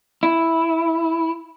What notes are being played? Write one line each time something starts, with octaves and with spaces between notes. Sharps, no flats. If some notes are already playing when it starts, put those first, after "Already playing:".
E4